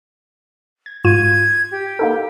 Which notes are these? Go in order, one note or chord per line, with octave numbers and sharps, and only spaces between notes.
G#6
G#2 F4 G#6 D#7
G4
A#3 D#4 A4